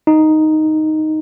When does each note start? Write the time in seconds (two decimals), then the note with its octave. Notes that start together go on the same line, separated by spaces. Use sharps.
0.07 D#4